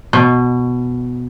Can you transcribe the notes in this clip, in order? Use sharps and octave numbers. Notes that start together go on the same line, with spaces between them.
B2